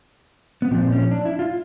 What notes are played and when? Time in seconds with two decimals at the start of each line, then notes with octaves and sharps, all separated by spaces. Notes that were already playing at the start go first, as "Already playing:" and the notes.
0.62 B3
0.71 A#2 F3 C4
0.92 C#4
1.11 D4
1.25 E4
1.39 F4